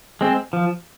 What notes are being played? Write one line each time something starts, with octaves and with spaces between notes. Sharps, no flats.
G#3 C4
F3